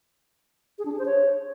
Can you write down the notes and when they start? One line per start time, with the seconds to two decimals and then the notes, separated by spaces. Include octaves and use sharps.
0.79 G#4
0.85 D4
0.92 G#4
0.99 C5
1.06 C#5